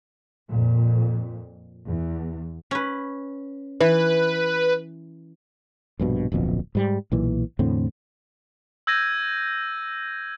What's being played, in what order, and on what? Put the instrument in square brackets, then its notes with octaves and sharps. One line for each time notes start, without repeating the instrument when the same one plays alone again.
[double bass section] F2 A#2
E2
[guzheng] C#4 B4
[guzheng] E3 [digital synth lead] B4
[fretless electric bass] A#1 G2 B2
D1 A#1 F2 B2
G#2 G3
B1 A#2 E3
E2 A2 D3 C4
[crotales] E6 G6 G#6 A#6 D#7